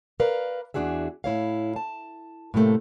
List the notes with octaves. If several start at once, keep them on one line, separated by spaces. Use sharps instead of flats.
A#4 B4 D5 F5
E2 B2 D4 F#4 G#4 E5
A2 E4 C#5 F5
A5
A2 C3 E3 A3 A#3